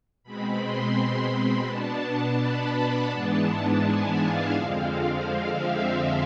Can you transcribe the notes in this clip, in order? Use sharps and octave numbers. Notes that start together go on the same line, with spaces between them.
B2 G#3 C4 B5
C6
B2 B3 D4 A5
B5
B5
G#2 E3 G#3 B3 D4 A5
G#5
F5
F2 D3 F3 G#3 C4
F5
E5